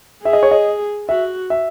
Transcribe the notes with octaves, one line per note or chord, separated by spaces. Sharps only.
G#4 E5
D#5
C#5
D#5
F#4 E5
E5